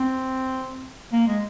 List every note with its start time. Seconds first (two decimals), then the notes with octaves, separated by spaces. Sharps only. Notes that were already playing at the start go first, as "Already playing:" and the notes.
Already playing: C4
1.12 A#3
1.27 G#3